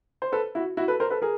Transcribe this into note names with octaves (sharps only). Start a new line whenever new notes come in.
C5
A4 B4
E4 F#4
E4 F#4
A4 B4
A#4 C5
A4 B4
G#4 A#4